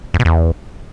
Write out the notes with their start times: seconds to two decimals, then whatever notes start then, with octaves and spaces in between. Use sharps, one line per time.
0.14 F2
0.19 B2
0.25 E2